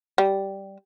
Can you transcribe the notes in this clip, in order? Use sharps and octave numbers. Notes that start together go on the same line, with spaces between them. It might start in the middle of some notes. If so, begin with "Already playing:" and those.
G3